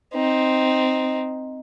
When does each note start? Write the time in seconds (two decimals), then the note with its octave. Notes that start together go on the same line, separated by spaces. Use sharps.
0.14 C4 D#4